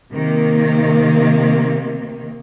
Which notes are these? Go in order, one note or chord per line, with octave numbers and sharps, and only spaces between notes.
C3 D#3 A#3